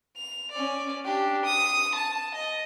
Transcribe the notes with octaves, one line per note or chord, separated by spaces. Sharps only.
F7
C#4 D5
D4 G4
D#6
A5
D#5